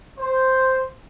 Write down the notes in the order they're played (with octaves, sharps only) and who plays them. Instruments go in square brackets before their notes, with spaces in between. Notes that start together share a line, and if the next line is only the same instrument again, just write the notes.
[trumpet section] C5